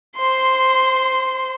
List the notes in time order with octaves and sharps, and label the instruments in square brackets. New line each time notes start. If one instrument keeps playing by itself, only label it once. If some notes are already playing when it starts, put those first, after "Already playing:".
[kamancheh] C5 C6